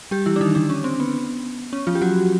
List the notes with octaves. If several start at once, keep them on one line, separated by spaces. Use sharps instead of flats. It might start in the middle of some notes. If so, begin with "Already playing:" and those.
G3 G4
E3 E4
D4
D#3 D#4
D3 D4
C#4
C4
B3
C#4
F3 F4
G4
F#3 F#4